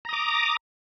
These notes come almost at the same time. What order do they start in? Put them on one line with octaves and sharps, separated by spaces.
A#5 D#6 D6